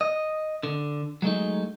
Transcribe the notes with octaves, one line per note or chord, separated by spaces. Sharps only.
D#5
D3
F#3 G#3 A3 D#4